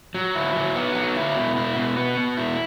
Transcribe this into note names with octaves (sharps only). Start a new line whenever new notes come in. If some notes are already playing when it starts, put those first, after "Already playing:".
F#3
E4
F#3
B3
F#3
E4
B2
E4
B2
B3
B2
E4